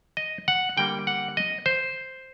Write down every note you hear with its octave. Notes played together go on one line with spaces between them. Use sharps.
D#5
F#5
D3 G3 A#3 G5
F#5
D#5
C5